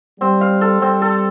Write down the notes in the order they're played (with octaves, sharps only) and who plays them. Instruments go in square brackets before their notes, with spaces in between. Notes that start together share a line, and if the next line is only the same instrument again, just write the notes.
[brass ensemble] G3 [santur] C4
[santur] F5
A4
[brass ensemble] G3 [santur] C4
[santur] A4